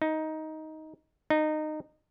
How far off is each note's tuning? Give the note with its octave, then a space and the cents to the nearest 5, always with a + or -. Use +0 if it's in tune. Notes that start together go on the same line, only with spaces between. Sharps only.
D#4 +10
D#4 -20